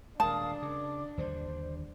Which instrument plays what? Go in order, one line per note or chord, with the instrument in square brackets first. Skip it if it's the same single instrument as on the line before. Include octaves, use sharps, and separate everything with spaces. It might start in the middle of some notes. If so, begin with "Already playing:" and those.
[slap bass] D#1 G#3 [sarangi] D4 [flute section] A#4 F5 D#6 [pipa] A5
[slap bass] C#3 [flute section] D6
[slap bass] D#2 D3 G3 [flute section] C5